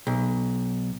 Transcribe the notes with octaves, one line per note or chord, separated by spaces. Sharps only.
B1